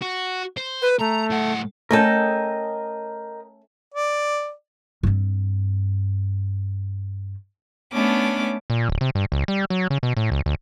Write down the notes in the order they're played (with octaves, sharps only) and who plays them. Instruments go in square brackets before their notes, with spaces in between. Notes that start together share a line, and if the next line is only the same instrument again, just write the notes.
[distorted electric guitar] F#4
C5
[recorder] B4
[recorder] A3 [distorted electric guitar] A#5
[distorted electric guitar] A2 F#5
[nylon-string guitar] A3 C#4 A4 [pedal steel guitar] A#4 D#5 G5
[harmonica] D5
[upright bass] G2 C4
[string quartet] A3 B3 C#4 D4 D6
[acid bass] A#2
D1
C3
G2
C#2
G3
F#3
C#3
B2
A2
C#2
D2